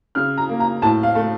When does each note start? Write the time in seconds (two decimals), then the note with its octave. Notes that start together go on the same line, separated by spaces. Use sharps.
0.15 C#3 F6
0.37 A#5
0.49 A#3
0.60 A#5
0.82 A2 A5
1.03 F5
1.15 A3